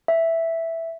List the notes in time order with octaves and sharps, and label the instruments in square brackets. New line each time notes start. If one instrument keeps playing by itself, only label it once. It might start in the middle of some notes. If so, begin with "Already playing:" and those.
[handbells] E5